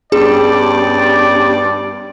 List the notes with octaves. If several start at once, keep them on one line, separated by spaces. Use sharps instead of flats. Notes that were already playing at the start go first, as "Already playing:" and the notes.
G2 B3 C#4 G4 G#4 D5